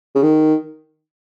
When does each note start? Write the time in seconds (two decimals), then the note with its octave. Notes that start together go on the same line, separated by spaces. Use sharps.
0.15 C#3
0.23 D#3